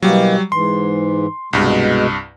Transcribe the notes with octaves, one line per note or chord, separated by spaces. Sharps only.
B2 E3 F#3 G3 A#3
G#2 E3 C6
C2 G2 B2 G#3